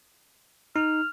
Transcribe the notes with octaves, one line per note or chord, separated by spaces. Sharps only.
D#4 F6